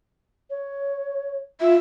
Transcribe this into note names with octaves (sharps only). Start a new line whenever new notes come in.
C#5
F4 E5